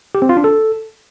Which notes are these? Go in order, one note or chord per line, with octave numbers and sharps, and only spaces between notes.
G4
C4
F4
D4
A4